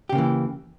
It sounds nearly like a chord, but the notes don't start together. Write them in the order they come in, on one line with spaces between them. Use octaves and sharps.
G4 C#3 A#3 E3